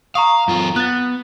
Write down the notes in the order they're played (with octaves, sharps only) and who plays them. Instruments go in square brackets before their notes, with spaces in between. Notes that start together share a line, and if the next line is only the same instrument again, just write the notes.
[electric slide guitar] F5 [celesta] A#5 C#6 D#6
[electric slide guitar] F#2 F4
[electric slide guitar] B3 [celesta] F#6 A6